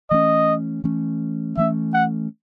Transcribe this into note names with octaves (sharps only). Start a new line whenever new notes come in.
E3 A3 C#4 D#5
E3 A3 C#4
E3 A3 C#4 E5
F#5